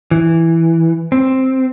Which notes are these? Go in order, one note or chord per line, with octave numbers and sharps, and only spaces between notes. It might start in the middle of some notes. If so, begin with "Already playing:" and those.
E3
C4